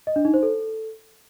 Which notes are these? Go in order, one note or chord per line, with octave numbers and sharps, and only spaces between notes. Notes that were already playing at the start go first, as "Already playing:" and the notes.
D#5
D4
D#4
C5
A4